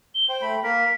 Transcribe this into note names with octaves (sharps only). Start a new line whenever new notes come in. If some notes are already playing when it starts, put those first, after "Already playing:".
G7
C5 G5
A3 B5
A#3 A#4 B6